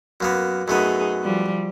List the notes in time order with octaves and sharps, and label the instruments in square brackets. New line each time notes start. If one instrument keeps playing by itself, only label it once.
[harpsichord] F#2 A#3 B3
[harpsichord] F#2 A3 B3 [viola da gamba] D#4 G#4
[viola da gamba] F3 G3